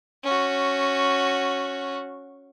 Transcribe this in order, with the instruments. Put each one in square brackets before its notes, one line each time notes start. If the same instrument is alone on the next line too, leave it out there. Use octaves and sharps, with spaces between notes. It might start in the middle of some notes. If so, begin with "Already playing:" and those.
[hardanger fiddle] C#4 F#4